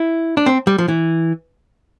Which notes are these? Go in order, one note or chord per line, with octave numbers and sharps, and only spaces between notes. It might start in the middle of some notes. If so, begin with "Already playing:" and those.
Already playing: E4
D4
C4
G3
F3
E3